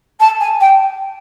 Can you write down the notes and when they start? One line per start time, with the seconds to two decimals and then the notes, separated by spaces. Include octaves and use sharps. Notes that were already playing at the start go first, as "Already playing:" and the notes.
0.20 A5
0.40 G#5
0.60 G5